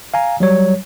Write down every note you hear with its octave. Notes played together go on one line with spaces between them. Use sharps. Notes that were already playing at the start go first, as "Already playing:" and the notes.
F5 G#5 A#5
F#3 G3 C#5